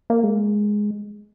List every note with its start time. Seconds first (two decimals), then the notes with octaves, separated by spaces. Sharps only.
0.10 A#3
0.24 G#3